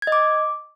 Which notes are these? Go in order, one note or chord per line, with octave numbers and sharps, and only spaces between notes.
G#6
D#5
D6